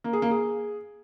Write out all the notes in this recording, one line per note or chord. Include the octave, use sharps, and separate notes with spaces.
A#3
G#4
A#3
G#4